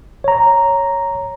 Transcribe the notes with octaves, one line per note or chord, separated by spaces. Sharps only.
C#5 A#5